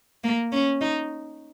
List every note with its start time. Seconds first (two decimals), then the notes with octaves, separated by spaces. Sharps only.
0.24 A#3
0.52 C#4
0.81 D#4